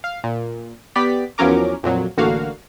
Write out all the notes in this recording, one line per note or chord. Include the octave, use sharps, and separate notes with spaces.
F5
A#2
B3 G4 D5 B6
E2 F3 F#3 C#4 A#4 D6
F2 A#2 F#3
A1 D3 A#3 F#4 F5